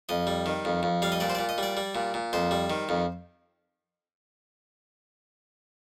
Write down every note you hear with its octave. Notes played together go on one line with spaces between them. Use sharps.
F2 D#5
G3
D#3
F2
F2
G3 F5
D#5
A#2 D5
C5
A#2 D5
D#5
G3 D5
G3
A#2
A#2
F2 C5
G3
D#3
F2